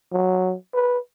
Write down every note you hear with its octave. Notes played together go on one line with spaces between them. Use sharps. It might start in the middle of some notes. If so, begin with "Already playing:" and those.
F#3
B4